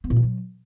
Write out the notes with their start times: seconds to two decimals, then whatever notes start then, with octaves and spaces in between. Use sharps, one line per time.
0.04 B3
0.10 A#2
0.16 E3
0.23 F#3